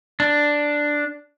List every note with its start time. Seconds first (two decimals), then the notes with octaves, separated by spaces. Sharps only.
0.20 D4